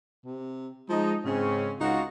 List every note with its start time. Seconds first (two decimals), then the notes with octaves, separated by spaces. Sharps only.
0.25 C3
0.89 F3 G#3 D#4
1.25 G#2 C#3 C4 C#4
1.80 C#2 D#4 F4 F#4